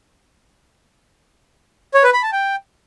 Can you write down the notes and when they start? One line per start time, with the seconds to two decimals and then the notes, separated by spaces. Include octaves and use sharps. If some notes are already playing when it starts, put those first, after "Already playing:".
1.94 C#5
2.04 B4
2.13 B5
2.23 A5
2.32 G5